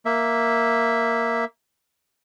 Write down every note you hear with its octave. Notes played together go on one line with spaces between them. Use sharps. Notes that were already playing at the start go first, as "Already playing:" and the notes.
A#3 E5